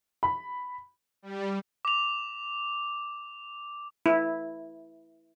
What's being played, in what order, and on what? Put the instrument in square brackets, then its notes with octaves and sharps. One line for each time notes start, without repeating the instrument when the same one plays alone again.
[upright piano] B5
[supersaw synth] G3
[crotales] D6 F7
[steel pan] E4